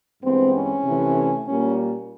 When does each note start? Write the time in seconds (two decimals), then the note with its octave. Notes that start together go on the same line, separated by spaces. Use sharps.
0.23 G2 E3 G#3 B3 C4
0.53 C#4
0.84 C3 E3 A3
1.46 A#2 G3 A#3 C#4